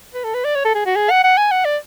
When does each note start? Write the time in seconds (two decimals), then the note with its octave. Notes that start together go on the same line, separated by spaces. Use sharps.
0.14 B4
0.24 A4
0.34 B4
0.45 D5
0.55 C#5
0.65 A4
0.75 G#4
0.86 F#4
0.96 G#4
1.10 F#5
1.24 F#5
1.37 G#5
1.51 F#5
1.65 D5